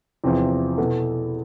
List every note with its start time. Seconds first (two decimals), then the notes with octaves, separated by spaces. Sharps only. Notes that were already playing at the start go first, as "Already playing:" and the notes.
0.24 E2 C3 F3 C4
0.78 B2 B3 E4 A4